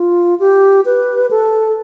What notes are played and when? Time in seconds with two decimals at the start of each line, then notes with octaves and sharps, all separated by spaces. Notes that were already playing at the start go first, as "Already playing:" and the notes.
Already playing: F4
0.40 G4
0.85 B4
1.31 A4